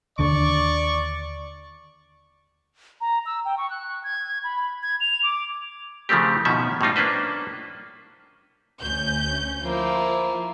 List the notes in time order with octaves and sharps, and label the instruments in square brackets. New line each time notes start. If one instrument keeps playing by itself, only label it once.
[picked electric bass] D#2 D3 [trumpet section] D5 C#6
[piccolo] A#5
E6
G5
C#6
F#6
G#6
B5
G#6
F7
D6
[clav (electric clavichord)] C#3 F3 A3 A#3 C4 G4
G#2 B2 D#3 F3 C#4 E5
A2 G3 D#4 F4
A#3 C#4 D4 B4 C5
[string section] D2 C#4 G6
[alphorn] F3 [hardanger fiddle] A#3 E4 [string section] F4